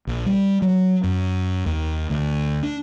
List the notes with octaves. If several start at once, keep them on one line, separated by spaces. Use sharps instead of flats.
A#1
G3
F#3
F#2
D#2
D2
D4